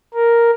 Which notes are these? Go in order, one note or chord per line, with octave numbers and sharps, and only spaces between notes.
A#4